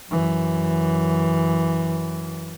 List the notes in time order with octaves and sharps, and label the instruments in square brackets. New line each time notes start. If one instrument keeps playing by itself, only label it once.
[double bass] F#2 E3